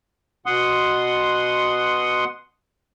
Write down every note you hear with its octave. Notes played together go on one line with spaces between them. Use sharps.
B2 F#5 C6 D#6